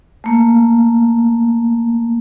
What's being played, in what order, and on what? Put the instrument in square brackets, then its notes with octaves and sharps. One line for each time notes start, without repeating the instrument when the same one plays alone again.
[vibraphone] A3 A#3